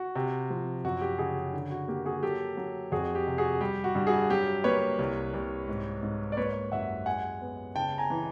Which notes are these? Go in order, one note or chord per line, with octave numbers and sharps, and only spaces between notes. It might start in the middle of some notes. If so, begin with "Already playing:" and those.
Already playing: F#4
C3
F3
F#2 F#4
G4
C#3 F#4 G#4
D3
F#4
A#3 G4
F#4 G#4
F#3 G4 A4
F#3
F2 F#4 G#4
G4
C3
F#4 G#4
G3 G4
F#4
G2
F#4 G#4
F#3 G4
A#3 B4 C#5
C2
C2
G#2
G#2
D5
A#3 B4 C#5
F#2 E5 F#5
G#3 F#5 G#5
B3
C#3 G5 A5
G#5 A#5
E3